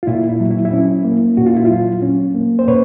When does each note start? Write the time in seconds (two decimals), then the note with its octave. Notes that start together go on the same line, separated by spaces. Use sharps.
0.03 F4
0.07 A#2 E4
0.29 E4
0.40 F#3
0.51 E4
0.65 E4
0.73 C#4
1.04 A#3
1.37 A#2 F#4
1.46 F4
1.56 E4
1.65 F4
1.70 F#3
2.02 C#4
2.35 A#3
2.59 C5
2.68 A#2 B4 C#5